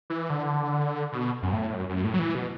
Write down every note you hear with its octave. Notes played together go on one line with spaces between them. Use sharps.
E3
D3
B2
F#2
A2
F#2
F#2
A2
F#3
E3
B2